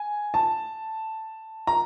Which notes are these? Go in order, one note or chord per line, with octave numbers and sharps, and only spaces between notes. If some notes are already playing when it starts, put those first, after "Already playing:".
Already playing: G#5
A5
A#5